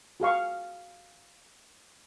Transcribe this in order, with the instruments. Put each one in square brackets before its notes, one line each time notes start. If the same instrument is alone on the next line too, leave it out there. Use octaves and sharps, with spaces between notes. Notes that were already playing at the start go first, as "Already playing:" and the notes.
[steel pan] F#4 G#4 F5 C#6